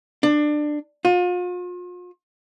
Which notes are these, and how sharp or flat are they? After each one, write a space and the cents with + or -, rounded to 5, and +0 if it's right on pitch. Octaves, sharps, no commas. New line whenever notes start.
D4 +20
F4 +40